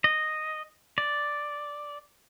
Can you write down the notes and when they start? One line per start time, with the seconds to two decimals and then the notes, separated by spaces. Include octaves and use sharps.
0.04 D#5
0.98 D5